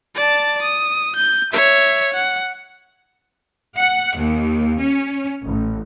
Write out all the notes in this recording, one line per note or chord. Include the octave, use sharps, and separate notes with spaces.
D5 A5
D#6
G6
C#5 E5
F#5
F#5
D#2
C#4
A1